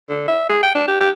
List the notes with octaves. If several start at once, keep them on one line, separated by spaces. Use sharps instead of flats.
D3
E5
G#4
G5
D4
G4
G4